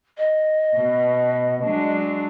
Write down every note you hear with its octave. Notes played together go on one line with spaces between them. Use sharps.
D#5
B2
F#3 G#3 D4